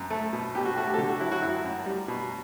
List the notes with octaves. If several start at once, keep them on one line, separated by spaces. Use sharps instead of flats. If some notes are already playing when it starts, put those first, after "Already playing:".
Already playing: F#2
A3
B2
B2 G4
F#4
A3 F#4
G4
A4
D3 G4
F#4
F#3 E4
F#4
F#2 E4
F#2
G3
B2